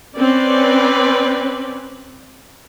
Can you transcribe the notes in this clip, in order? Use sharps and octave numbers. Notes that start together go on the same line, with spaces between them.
C4 C#4 B4 D5